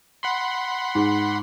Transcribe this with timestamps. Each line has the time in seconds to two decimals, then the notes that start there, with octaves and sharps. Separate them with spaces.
0.23 F#5 B5 C6
0.95 G#2